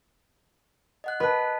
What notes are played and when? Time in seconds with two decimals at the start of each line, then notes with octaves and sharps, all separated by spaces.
1.04 D#5 F#5 F#6
1.20 B4 D#5 A5